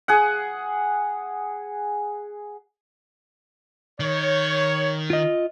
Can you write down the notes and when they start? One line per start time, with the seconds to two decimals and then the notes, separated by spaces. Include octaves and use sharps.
0.08 G#4 F#5
4.00 D#3 C#5
5.10 F4 D#5